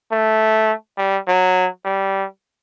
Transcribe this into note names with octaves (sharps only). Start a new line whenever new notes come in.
A3
G3
F#3
G3